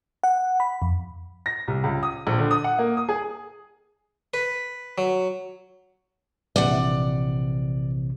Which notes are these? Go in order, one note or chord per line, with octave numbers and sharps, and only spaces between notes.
F#5
B5
F2
A#6
C2
C#2
D#6
A#1
D3
D#6
F#5
A#3
D#6
G#4
B4
F#3
A#1 C3 E3 D5 F#5